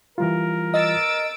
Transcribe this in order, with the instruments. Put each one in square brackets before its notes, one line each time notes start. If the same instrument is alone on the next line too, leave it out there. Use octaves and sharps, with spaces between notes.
[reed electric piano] E3 G3 F4 [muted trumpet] A#4
[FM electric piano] D#5 [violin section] E6 A6 D7